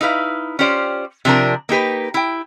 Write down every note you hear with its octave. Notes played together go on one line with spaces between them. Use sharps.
D#4 E4 B4 F5
C#4 F4 G4 C5 D5
C3 F3 D4 A#4
A#3 D#4 G4 B4
E4 G5